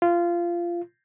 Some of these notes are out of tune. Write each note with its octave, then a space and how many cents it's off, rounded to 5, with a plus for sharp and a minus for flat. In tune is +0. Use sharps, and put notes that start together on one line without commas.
F4 -20